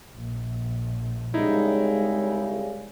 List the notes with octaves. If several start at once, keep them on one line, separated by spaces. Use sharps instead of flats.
A#1
C2 C#3 G#3 D#4 E4